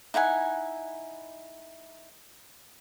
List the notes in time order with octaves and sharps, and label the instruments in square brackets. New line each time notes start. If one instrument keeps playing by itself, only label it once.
[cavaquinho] D#4 E4 F#5 G#5